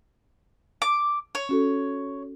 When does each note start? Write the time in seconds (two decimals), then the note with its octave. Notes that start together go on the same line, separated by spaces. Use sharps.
0.82 D6
1.35 C#5
1.49 C#4 F#4 A4